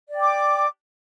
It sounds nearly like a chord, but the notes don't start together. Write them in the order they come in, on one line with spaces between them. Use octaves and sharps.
D5 G5 D6